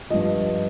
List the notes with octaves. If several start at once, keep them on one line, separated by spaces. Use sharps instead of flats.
G2 F3 D#5